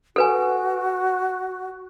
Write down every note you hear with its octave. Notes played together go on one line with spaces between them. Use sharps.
F#4 A4 B4 G#5